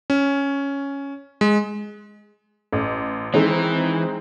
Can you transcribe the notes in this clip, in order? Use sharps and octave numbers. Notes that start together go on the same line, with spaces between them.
C#4
G#3
A1
D#3 E3 G#3 C4